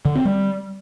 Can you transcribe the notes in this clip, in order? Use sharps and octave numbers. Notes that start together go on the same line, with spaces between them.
D3
C4
G3